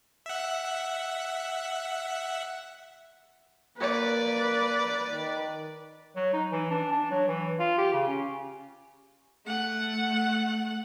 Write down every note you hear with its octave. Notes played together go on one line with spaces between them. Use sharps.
E5 F#5
A#3 B4 D5
D#3
F#3
D#4
E3
D4
D4
F#3
E3
F4
G4
C#3
C#4
A3 F#5